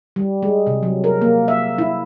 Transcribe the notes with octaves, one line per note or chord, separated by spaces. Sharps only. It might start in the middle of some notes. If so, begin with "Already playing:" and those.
G3
G#3
C3
F#3
A#4
A#3
E5
E4